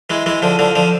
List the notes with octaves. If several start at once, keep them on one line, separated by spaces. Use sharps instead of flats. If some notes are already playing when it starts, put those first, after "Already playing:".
E3 G#3
E3 G#3
D3 F3
D3 F3
D3 F3